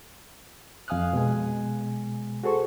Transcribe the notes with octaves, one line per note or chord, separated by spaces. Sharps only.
F2 F5 G#5 D#6 F6 F#6
B2 G#3 G#5
F#4 G#4 A4 C5 C#6